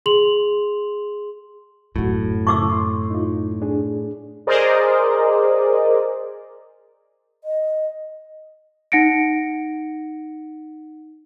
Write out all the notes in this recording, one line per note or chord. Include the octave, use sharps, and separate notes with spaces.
G#4 C6 F7 F#7
F#2 A2 C3 F#3 F#4
C#3 E4 A5 C#6 D6 E6
C6
D#4 F4
D4 G#4
G#4 A#4 C5 D5 D#5
D#5
D#4 F#5 A#6 C#7 D7